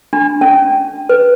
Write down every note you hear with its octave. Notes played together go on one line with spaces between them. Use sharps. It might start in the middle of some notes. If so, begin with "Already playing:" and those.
D4
C#4
B4